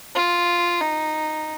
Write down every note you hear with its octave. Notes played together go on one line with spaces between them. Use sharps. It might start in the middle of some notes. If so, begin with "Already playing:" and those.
F4
D#4